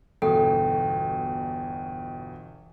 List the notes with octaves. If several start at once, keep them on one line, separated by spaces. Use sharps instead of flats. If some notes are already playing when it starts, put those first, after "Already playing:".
G1 E2 B2 A4 G5